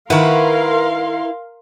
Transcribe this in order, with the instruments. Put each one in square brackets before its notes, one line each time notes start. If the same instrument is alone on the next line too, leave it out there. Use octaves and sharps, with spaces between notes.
[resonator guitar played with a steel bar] D#3 F#5 [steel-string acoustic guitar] E4 B4 [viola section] A#4 F5 C6